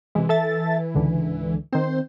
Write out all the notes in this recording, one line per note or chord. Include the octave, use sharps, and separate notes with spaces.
C3 E3 G#3
A4 E5 A6
C#2 G#2 D3
D#3 C4 C5